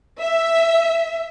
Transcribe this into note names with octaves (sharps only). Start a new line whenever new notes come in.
E5